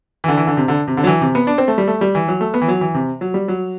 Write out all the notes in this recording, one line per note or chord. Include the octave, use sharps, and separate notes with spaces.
E3
D3
E3
D3
C3
D3
C3
D3
F#3
E3
C3
B3
D4
C4
A3
G3
A3
G3
E3
F#3
A3
B3
E3
F#3
E3
C3
F#3
G3
F#3